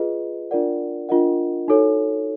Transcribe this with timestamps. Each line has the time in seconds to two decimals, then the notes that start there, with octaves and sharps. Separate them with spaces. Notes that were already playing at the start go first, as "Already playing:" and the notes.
Already playing: F4 G#4 B4 D#5
0.51 D4 F4 A#4 D5 F#5
1.09 D4 F4 A#4 D#5 F#5
1.68 D#4 F#4 A4 C#5